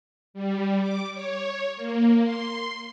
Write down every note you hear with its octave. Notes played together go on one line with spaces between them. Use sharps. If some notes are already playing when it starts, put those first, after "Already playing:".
G3
D6
C#5
A#3
C6